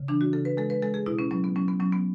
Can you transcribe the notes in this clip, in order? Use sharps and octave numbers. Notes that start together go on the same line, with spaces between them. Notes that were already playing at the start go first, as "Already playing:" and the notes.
Already playing: C#3
E3 D4
F#4
C#3 A4
B4
G#3 A4
B4
G#3 A4
G#4
B2 E4
C#4
F#3 C#4
B3
F#3 C#4
B3
F#3 C#4
B3